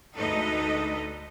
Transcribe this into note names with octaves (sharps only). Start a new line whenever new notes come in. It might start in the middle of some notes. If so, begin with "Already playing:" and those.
D2 G#3 D#4 A4 B4 D#5